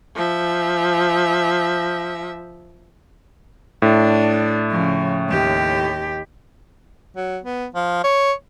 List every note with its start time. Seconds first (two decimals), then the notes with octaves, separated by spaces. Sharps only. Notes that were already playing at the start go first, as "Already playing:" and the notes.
0.15 F3 E5
3.82 A2 D4
4.70 C#3 F3
5.29 D#2 G4
7.16 F#3
7.44 B3
7.75 F3
8.04 C#5